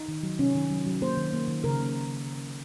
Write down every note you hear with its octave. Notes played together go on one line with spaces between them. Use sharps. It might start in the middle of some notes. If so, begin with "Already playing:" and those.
Already playing: D#4
D#3
F#3
C3 C#4
D#3
F#3
F#3
A#3 C5
D#3
A#3
D#3
C#3 A#4
A#3